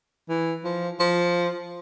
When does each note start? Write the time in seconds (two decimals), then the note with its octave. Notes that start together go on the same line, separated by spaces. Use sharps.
0.29 E3
0.64 F3
1.00 F3